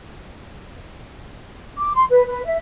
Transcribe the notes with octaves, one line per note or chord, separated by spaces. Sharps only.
D6
C6
B4
B4
E5